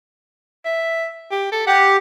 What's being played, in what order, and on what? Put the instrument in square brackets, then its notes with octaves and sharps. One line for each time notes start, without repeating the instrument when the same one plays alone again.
[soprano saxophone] E5
G4
A4
[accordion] G4 [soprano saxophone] F#5